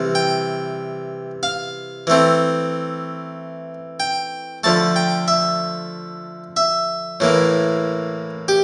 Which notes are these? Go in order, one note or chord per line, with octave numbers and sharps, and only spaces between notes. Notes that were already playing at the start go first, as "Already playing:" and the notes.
Already playing: C3 E3 G3
G5
F5
E3 A3 C4
G5
D3 F3 A3 A5
G5
E5
E5
A2 E3 A#3
G4